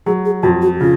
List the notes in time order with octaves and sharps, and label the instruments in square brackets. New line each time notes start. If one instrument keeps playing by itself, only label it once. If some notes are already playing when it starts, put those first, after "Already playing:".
[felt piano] F#3 [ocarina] G#4
[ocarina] G#4
[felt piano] F2 [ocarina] F#4
[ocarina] F#4
[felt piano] C#3 [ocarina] F4